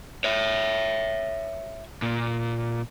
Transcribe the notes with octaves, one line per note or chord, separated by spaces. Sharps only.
C#5 E5
A#2